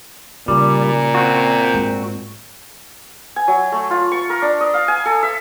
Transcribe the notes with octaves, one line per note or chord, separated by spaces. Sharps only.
A#2 C#3 G3
C4 F#4
G#2
G#5
F#3
A3
F4
C#6
A#4
D4
D#5
F5
G#5
A4
E5